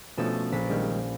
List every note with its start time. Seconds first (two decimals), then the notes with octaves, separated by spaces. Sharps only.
0.18 B2 F3 A3 C#4 A4 D5
0.52 A#1 D5 B6
0.69 D#3 G3 G#3